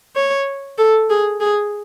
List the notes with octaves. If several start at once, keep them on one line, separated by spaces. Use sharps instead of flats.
C#5
A4
G#4
G#4